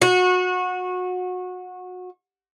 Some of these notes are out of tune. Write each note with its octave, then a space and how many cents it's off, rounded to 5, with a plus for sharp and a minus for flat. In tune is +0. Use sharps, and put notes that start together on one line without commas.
F#4 -25